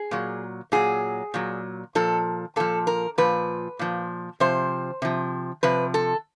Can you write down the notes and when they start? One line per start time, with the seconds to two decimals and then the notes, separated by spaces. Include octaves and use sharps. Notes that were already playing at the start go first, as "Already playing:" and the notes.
Already playing: G#4
0.11 A#2 F#3
0.72 A#2 F#3 G#4
1.34 A#2 F#3
1.95 A#2 F3 A4
2.56 A#2 F3 A4
2.87 A#4
3.18 A#2 F3 B4
3.79 A#2 F3
4.40 C3 F3 C5
5.02 C3 F3
5.63 C3 F3 B4
5.94 A4